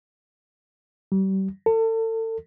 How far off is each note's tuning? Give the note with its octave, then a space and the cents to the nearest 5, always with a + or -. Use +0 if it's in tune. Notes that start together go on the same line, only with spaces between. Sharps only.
G3 -35
A4 +35